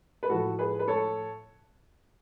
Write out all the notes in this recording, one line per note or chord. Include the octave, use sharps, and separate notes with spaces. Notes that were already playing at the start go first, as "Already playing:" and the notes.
B4
A2 F3 F#4 A4
G#4 B4
B4
A4 C#5